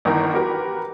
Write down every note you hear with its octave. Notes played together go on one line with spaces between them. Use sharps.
G1 D#3 E3 A#4
F#4 G4 A#4 B4